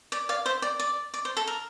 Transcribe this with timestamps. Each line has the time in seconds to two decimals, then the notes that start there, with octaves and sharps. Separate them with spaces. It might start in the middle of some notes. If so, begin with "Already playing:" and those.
0.12 D5
0.29 D5 F5
0.46 C5 E5
0.62 D5
0.79 D5
1.14 D5
1.25 C5
1.37 A4
1.47 A#4